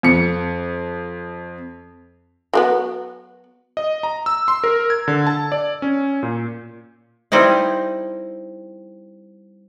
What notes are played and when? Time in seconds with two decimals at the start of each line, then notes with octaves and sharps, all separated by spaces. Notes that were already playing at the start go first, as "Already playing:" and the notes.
0.03 F2 C#7
2.54 F#3 A#3 B3
3.77 D#5
4.03 A#5
4.26 E6
4.48 C6
4.64 A#4
4.90 G#6
5.08 D3
5.27 A5
5.52 D5
5.82 C#4
6.23 A#2
7.32 G3 C4 D#4 E4